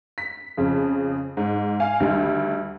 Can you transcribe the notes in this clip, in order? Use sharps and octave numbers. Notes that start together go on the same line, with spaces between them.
B6
F2 C#3 F3
G#2
F5 G#5
D2 D#3 G3